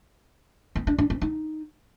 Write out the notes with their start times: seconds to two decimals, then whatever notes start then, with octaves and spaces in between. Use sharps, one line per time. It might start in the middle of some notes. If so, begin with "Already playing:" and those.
0.75 B3
0.87 D4
0.98 D4
1.10 C4
1.21 D#4